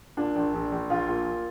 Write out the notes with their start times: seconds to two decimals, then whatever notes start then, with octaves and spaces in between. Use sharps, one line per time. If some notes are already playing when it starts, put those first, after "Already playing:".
0.17 A#2 D4
0.35 A#1
0.54 A#1
0.72 A#1
0.90 A#1 F4
1.09 A#2